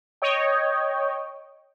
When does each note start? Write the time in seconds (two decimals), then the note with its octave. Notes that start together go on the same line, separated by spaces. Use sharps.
0.22 C#5 D#5 G5